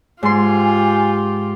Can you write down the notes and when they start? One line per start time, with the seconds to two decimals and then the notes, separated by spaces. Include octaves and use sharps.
0.23 G#2 F4 G4 G#5 C6